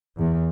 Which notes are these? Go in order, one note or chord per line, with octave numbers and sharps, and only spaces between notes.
E2